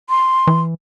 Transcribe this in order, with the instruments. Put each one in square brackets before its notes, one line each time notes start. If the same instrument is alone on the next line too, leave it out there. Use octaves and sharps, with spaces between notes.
[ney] C6
[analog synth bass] E3